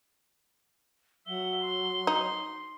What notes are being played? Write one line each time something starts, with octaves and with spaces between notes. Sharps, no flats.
F#3 E5 F#5 G7
C6
D#4